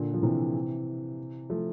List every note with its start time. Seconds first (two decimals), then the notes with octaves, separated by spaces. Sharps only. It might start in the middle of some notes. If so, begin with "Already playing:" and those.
Already playing: A#2 D3
0.14 F3
0.23 C3 E3
1.50 F3 A3